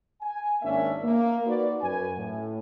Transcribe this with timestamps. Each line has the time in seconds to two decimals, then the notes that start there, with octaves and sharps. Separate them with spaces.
0.21 G#5
0.62 G#1 A#3 C#4 D4 E5
1.04 A#3
1.47 D#4 F#4 B4 D5
1.81 F#2 F#4 B4 G#5
2.18 A2